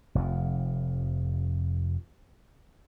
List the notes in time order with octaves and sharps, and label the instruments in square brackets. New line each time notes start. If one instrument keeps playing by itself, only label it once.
[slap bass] F1 F2